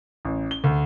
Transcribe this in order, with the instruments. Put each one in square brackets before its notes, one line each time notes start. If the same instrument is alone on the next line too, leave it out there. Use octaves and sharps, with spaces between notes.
[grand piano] A1
G7
D2